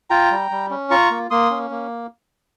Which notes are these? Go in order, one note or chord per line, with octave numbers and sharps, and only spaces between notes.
F4 G5 A#5
G3
G3
C#4
F4 A#5 C#6
A#3
A#3 C6 D#6
C#4
A#3